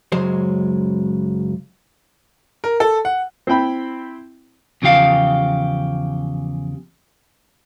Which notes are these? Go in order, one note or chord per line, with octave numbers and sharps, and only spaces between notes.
C#2 F#2 F#3 G#3 C5
A#4
A4
F#5
C4 E4 G5 B5
E2 C#3 F3 G4 F5